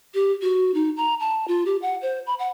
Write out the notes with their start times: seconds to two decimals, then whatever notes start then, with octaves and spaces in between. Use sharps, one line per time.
0.14 G4
0.42 F#4
0.74 D#4
0.97 A#5
1.20 A5
1.48 F4
1.66 G4
1.82 F#5
2.02 C5
2.27 B5
2.39 F#5